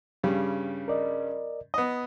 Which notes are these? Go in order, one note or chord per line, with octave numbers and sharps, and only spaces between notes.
G2 C#3 G3
A#4 D5 D#5
B3 D#5 D#6